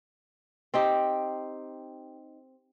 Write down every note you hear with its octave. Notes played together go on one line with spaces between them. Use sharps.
C4 D#4 G4